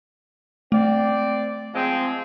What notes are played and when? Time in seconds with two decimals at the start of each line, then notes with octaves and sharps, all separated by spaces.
0.72 A3 C4 D5
1.74 F3 G#3 C4